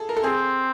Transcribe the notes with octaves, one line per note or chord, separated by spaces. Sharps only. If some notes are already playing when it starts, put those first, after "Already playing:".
Already playing: G#4 A4
A#4
A4
C4 G#4